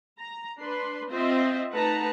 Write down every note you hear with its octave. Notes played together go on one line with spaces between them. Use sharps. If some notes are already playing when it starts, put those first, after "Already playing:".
A#5
D4 B4 C6
C4 F4 C5 D#5 E5
A3 D#4 B4 F#5 A5 A#5